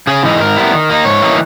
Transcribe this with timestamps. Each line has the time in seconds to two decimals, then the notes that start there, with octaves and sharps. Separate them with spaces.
0.07 C#3 G#4
0.23 E3 G#3 D#4
0.40 G#2 A#4
0.56 G3 B3 E4
0.73 D#3
0.90 A#3 D#4
1.05 G#2 C#5
1.22 E3 A#3 D#4